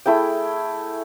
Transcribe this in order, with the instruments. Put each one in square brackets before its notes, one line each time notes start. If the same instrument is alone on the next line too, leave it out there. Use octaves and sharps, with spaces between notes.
[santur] A3 E4 G#4 G5